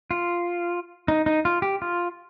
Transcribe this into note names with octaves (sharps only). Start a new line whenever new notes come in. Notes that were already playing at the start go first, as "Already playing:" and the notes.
F4
D#4
D#4
F4
G4
F4